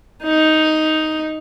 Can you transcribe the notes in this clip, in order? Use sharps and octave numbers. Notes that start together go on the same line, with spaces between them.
D#4